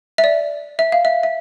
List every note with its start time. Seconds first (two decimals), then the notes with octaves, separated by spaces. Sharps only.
0.18 E5
0.24 D5
0.79 E5
0.92 F5
1.05 E5
1.23 E5